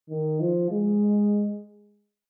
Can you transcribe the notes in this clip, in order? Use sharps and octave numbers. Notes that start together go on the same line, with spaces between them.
D#3
F3
G#3